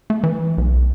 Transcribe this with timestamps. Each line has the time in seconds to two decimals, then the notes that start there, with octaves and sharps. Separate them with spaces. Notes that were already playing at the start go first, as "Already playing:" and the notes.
0.10 A3
0.23 E3
0.58 B1